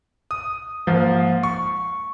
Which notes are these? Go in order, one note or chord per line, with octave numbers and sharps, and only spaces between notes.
D#6
G#2 F3 A#3
C#6